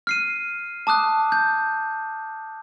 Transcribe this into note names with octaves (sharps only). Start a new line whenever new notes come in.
F6 C7 D#7
A5 D6 D#6 F#6
G6